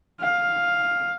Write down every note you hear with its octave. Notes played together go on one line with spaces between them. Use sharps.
F5